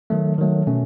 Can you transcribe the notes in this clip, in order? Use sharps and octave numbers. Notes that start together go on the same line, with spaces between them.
D#3 F#3 A3
D#3 F#3 A3
B2 A3 C#4